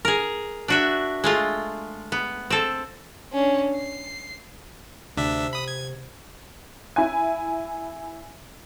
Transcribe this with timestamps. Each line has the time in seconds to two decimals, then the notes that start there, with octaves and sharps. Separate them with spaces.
0.05 G#4 A#4
0.68 D4 F#4 E5
1.24 G#3 A3 F4
2.12 B3
2.50 C4 A4
3.33 C#4 D4
3.76 C7
5.17 D2 C3 D4 E5
5.53 B5 D#6
5.68 G#6
6.96 E4 G#5